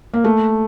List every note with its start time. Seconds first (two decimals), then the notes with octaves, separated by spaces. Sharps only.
0.14 A#3
0.24 A3